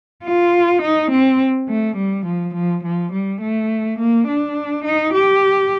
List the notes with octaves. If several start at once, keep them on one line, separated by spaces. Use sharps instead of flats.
F4
D#4
C4
A3
G3
F3
F3
F3
G3
A3
A#3
D4
D#4
G4